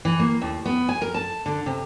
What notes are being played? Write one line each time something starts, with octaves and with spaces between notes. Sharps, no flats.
E3
A#3
D#2
B3
G#5
A#4
A5
D3
C3